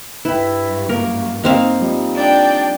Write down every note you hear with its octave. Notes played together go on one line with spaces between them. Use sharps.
G2 E4 B4 G5
A#3 A#4
A#3 C4 D#4 F5
F3 G3 D#4
D4 D5 G5